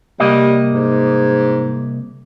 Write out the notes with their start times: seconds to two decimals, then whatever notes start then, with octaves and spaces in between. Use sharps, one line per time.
0.20 C2 G3 A#3 D#5
0.73 G#2